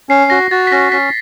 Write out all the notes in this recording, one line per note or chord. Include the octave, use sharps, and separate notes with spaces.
C#4 C7
F#4 A#6
F#4 A6
B6
C#4 A#6
C#4 B6